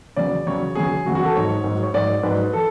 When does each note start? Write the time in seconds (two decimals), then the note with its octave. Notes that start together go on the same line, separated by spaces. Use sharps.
0.16 E2 C#3 F#3 D5
0.46 E2 C#3 F#3 C#5
0.75 E2 C#3 F#3 G#4
1.05 E2 C#3 F#3 F#4
1.15 F#4
1.25 A4
1.34 G#2 F#3 C#5
1.64 G#2 F#3
1.83 C#5
1.94 G#2 F#3 D5
2.23 G#2 F#3 B4
2.53 E3 A4